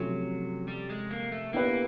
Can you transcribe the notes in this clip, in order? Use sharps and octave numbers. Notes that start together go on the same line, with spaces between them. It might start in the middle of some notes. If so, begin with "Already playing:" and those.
Already playing: C3 F3 F#3 A3 C#4
G3
G#3
A#3
A3
A#3 B3 E4 G4 B4